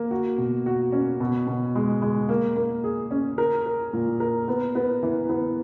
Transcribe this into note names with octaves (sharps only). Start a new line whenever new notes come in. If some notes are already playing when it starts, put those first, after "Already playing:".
Already playing: A#3
F#4
B2
F#4
C#4
B2
B2
G#3
G#3
A#3
A#3
G#4
C#4
A#4
A#4
A#2
A#4
B3
B3
E3
B3